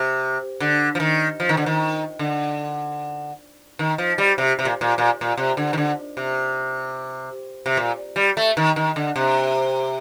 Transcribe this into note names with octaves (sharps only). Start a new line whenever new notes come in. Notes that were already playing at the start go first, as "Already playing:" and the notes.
Already playing: C3
D3
F3
D#3
F3
D#3
D3
D#3
D3
D#3
F3
G3
C3
C3
A#2
A#2
A#2
A#2
C3
D3
D#3
D3
C3
C3
A#2
G3
A3
D#3
D#3
D3
C3